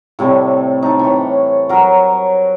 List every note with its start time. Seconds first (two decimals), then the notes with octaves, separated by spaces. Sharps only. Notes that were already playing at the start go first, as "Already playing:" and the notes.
0.19 A2 C3 G3 A3
0.83 D#4 A4
0.99 E3 C#5
1.69 F#3 A#4